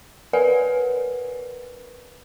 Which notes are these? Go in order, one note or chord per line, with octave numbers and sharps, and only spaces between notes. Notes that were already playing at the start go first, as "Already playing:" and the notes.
A#4 B4 C#5 D5 F#5 G#5